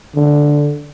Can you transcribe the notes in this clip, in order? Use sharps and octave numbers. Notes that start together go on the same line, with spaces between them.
D3